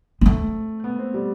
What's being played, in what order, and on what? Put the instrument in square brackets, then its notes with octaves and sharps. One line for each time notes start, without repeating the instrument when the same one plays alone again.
[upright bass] B3
[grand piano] A3 [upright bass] C4
[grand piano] B3
C4
G3